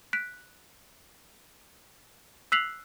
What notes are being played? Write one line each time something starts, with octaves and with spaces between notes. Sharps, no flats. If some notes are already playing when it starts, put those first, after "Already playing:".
F#6 B6 D7
E6 F#6 B6 C7 F7 F#7